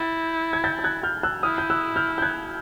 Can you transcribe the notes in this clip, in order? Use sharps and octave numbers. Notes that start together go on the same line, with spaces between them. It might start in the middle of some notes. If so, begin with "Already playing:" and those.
Already playing: E4 G6 A6
G#6
G6 A6
G6
F#6 G#6
F6 G6
E6 F#6
E4 D#6 F6
G6
E6 F#6
F6 G6
G6
F#6 G#6